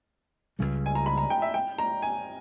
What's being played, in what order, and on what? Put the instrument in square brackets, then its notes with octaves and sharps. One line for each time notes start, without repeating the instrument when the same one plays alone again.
[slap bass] C#2 C#3 G3
[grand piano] G#5
A#5
B5
A#5
G5
E5
G5
A#5
G#5